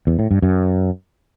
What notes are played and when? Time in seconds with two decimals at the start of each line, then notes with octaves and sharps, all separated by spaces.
0.07 E2
0.19 A2
0.31 G2
0.42 F#2